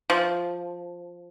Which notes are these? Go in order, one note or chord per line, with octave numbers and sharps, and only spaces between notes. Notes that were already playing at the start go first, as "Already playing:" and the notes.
F3